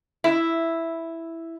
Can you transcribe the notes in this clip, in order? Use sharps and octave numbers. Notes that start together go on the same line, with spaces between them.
E4